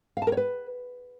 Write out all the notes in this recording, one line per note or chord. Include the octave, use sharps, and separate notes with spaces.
F5
A5
A#4
C#5
B4